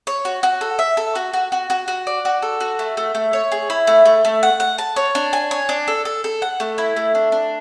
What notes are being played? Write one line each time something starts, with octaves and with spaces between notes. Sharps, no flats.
C#5
F#4
F#4
A4
E5
A4
F#4
F#4
F#4
F#4
F#4
D5
F#4
A4
F#4
A3
A3
A3
C#5
G#4
E4
A3
A3
A3
F#5
F#5
A5
C#5
D4
G#5
C#5
D4
A4
A4
A4
F#5
A3
E4
A3
D4
D4